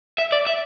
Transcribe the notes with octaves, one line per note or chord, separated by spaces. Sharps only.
E5
D5
E5